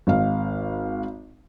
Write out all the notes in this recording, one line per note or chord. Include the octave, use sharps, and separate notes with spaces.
G#1 F5